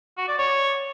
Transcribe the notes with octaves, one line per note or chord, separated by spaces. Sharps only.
F#4
D5
C#5